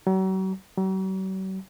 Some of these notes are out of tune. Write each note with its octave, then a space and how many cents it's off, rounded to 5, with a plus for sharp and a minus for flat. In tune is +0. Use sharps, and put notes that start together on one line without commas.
F#3 +40
F#3 +45